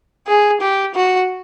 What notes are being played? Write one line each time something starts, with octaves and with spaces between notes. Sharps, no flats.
G#4
G4
F#4